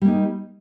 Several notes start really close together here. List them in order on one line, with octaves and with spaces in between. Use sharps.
G3 A#3 D#4